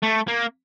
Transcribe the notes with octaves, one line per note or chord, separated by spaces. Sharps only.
A3
A#3